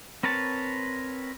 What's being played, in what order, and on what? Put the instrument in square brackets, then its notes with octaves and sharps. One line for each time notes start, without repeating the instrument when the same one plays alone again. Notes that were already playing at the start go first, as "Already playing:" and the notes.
[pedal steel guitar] C4 A#4 B4 C#5 A5